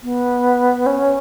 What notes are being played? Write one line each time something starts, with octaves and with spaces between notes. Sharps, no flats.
B3
C#4